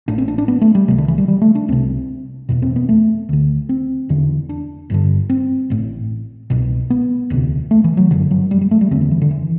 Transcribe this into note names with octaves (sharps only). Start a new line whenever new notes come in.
A1 A2 D4
C4
D4
D4
B3
A3
G3
C2 C3 G3
D3
E3
G3
G3
A3
D4
C2 C3 C4
F#1 E2 B2
C4
B3
A3
D2 D3
C4
E1 E2 D3
D4
G1 G2 D3
C4
A1 A2
C2 B2
B3
E1 D2 C3
A3
E3
F#3
G1 F#2 D3 F#3
F#3
G3
G3
A3
G3
F#1 E2 D3 C4
B3
E3
D3
E3